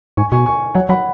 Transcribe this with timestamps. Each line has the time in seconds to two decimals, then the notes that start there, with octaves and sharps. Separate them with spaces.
0.17 G#2 G#5 C#6
0.32 B2 G#5 C#6
0.46 G#5 C#6
0.75 F#3 C#5 F#5
0.89 F#3 F#5 B5